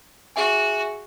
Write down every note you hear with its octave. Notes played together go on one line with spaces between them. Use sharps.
F#4 G#4 E5 G#5